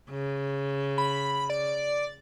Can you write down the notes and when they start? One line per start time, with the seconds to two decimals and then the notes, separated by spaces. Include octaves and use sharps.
0.10 C#3
0.98 B5
1.50 D5